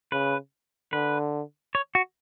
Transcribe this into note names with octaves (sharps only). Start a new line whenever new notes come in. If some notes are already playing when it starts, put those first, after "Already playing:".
C#3 B4
D3 B4
C#5
F#4